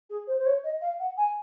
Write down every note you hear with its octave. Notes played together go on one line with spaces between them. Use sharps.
G#4
C5
C5
C#5
D#5
F5
F#5
G#5